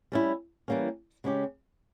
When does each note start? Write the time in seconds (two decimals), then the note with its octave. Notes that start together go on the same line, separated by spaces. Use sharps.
0.12 G3 C#4 E4
0.68 E3 G3 A#3 C#4
1.24 C#3 G#3 C#4 G4